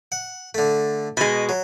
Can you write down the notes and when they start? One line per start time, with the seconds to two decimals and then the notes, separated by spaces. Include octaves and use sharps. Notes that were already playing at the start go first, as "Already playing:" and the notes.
0.12 F#5
0.55 D3 A3
1.17 B2 G#3 B5
1.49 F#3